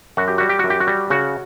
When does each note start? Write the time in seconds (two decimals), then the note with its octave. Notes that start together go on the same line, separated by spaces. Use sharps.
0.17 F#2 F#4
0.28 G4
0.38 G3 F#4
0.49 G4
0.59 F#2 F#4
0.70 G4
0.80 F#4
0.87 G3
1.10 C#3 F#4